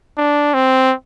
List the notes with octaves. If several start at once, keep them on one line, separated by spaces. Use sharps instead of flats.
D4
C4